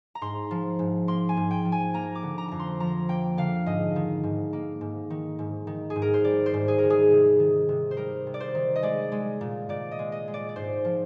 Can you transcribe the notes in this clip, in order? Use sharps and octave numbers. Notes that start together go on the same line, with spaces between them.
A#5
G#2 C6
F3
G#2
A#3 C6
G#5
G#2
G5
F3
G#5
A#3 A#5
D6
D3
A#5
F2 A#5
C6
F3 A#5
A#3 G5
D3 F5
G#2 D#5
D#3
G#2
A#3
G#2
D#3
G#2
D#3
G#4
G#2
A#4
C5
G3 D5
C5
G#2
G#4
D#3 A#4
G#4
C3
D#3
C3
C5
G3 A#4
C3
D5
C5
D#3
D#5
G#3 D5
G#3
A#2
A#2 D5
D#5
G#3
D#5
G#3
D5
D5
G#2 C5
F3